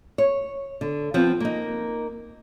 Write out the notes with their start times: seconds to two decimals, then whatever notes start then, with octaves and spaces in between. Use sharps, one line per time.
0.18 C#5
0.81 D3
1.14 F3 B3 C4 F4
1.40 A#3 D#4